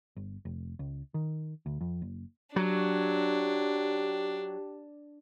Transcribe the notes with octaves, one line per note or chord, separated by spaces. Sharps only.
G1
F1
C#2
D#3
D2
F2
F#1
F#3 D4 G4